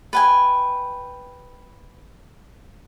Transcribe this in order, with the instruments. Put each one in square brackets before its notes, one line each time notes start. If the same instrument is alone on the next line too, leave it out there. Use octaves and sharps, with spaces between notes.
[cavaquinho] B4 G5 G#5